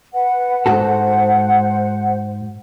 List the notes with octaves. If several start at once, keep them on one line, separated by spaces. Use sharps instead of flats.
B4 F#5
G#2 F#4 A4 C5 F#5